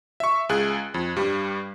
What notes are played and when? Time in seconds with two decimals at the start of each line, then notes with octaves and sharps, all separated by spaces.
0.20 E5 C#6
0.49 C#2 G#4 F#6
0.94 F2
1.16 G2 G3